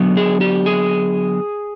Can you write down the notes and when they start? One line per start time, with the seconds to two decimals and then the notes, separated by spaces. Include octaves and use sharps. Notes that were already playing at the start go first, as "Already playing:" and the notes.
Already playing: D3 F#3 B3
0.17 G#4
0.41 G4
0.66 G#4